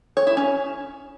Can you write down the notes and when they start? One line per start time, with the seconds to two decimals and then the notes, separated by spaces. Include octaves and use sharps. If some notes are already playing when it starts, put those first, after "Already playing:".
0.17 C#5
0.27 E4
0.37 C#4